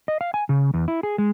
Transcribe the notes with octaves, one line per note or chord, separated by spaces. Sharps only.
D#5
F5
G#5
C#3
E2
E4
G#4
G#3